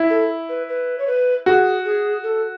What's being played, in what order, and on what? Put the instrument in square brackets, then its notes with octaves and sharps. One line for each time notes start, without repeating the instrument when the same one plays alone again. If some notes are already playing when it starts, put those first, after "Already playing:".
Already playing: [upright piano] E4
[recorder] A4
B4
B4
C#5
B4
[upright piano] F#4 [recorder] G#4
[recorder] G#4
A4